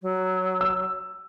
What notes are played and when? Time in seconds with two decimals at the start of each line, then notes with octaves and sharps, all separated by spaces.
0.02 F#3
0.61 E6